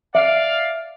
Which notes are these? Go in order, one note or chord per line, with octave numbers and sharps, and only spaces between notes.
D5 E5 F5